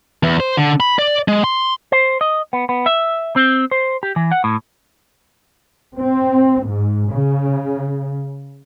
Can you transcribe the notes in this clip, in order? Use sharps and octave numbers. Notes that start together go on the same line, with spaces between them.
E2
C5
D3
B5
D5
G#3
C6
C5
D#5
B3
B3
E5
C4
C5
G4
E3
F#5
A2
C4
G#2
C#3